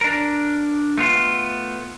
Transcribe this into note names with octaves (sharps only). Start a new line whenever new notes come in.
D4 A#4
A3 B3 F4